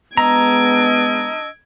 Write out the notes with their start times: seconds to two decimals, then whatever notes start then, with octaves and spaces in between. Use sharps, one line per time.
0.17 G#3 B3 D4 D#5 A#5 E6 G#6 D7